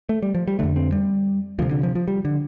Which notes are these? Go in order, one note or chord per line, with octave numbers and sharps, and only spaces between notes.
A3
G3
F3
G3
F2 D3 A3
C4
G3
D2 C3 F3
D3
F3
F3
G3
D3